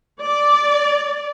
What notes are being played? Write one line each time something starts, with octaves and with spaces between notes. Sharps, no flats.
D5